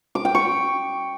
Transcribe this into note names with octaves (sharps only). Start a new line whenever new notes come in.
D6
G5
C#6